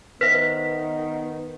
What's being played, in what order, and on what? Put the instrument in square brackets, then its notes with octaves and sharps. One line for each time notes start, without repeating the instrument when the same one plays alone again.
[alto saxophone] D#3 [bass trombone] B3 [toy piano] B4 C5 E5 [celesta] B6